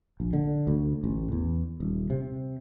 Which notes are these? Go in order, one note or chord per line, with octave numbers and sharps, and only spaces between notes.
A#1
D3
D2
A1
E2
D#1
C3